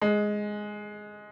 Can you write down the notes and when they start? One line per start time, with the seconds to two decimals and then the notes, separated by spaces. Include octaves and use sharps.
0.02 G#3